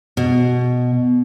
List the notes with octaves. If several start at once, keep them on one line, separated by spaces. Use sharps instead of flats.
B2